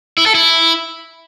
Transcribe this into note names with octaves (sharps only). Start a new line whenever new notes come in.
E4
A4
E4